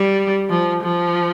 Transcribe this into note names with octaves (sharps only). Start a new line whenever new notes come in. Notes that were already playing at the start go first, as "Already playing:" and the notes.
Already playing: G3
F3
F3